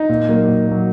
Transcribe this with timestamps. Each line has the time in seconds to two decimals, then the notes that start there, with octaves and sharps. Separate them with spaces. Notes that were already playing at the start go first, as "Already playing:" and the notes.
Already playing: D#4
0.09 A#2
0.29 F#3 A#3
0.48 A#2
0.67 F#3 A#3